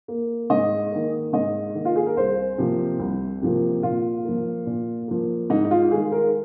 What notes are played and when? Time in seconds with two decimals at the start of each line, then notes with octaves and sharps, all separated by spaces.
0.08 A#3
0.50 G#2 D#5
0.92 D#3 A#3
1.33 G#2 D#5
1.75 D#3 A#3
1.85 F4
1.96 G#4
2.06 A#4
2.17 C2 C5
2.58 C3 F3 A#3
3.00 C2
3.42 C3 F3 A#3
3.83 A#2 F4
4.25 F3 A#3
4.66 A#2
5.08 F3 A#3
5.50 G#2 D#4
5.64 D#4
5.71 F4
5.91 D#3 G#3 G#4
6.12 A#4